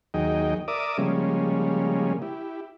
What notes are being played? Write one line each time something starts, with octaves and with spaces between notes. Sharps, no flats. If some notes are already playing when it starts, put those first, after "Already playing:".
D#2 F#3 D#4 G#4 D#5 G5
A#4 D5 E5 D6 D#6
C#3 F3 G3 G#3 A#3 C#4
E4 G4